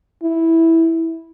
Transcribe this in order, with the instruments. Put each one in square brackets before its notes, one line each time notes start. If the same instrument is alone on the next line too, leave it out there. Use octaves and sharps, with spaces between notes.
[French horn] E4